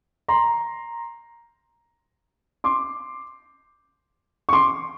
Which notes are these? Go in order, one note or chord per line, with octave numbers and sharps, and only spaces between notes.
A#5 C6
C6 D6
C#6
C6 D6